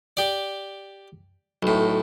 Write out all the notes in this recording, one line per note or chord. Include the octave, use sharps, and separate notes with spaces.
G4 D5
B1 A2